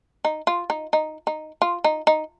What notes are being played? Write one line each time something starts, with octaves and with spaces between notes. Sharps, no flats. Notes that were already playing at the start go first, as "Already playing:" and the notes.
D#4
F4
D#4
D#4
D#4
F4
D#4
D#4